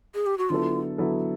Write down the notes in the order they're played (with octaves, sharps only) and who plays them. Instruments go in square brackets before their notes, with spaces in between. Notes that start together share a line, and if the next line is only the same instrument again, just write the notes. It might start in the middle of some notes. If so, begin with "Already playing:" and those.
[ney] G#4
G4
F#4
[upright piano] D3 F#3 B3 E4 A4 [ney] F4
[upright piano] D3 F#3 B3 E4 A4